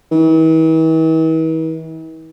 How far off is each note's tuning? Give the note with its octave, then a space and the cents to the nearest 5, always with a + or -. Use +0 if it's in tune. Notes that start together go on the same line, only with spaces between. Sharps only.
E3 -45